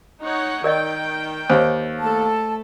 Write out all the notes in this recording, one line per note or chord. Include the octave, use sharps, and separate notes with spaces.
D#4 C#5 F#5
D#3 A#4 D5 D#5 G5
D#2 C5 C#5
A3 A4 A5